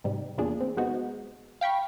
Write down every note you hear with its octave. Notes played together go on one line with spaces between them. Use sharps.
G#2 C3 G3
E2 A#2 D4 G#4
C4
C3 G#3 B3 C4 D#4 F#4
F5 G5 B5 C#6